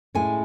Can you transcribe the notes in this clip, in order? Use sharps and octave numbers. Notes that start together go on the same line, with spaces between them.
A2 G#3 C#4 E4 G#5